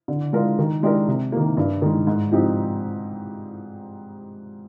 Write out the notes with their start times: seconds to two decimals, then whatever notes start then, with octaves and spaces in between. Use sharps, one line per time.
0.08 D3
0.33 G#3 D4 F4 A#4
0.59 D#3
0.83 G#3 D4 G4 A#4
1.08 C3
1.32 D#3 A#3
1.57 G2
1.82 D#3 G#3
2.07 G#2
2.32 F3 C4 D#4 G4